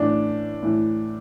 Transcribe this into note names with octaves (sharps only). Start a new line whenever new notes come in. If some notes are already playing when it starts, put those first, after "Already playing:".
Already playing: A2 E3 D4
A2 E3